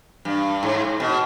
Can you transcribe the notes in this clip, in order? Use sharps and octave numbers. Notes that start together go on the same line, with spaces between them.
G2
G#2
B2